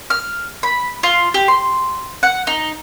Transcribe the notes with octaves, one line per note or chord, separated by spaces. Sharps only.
F6
B5
F4
G4
C6
F#5
D#4